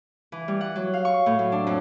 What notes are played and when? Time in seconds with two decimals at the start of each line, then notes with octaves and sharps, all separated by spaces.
0.32 E3
0.48 G3
0.61 F#5
0.76 F#3
0.94 F5
1.05 C#6
1.26 A2
1.39 F#3
1.52 D4
1.67 F2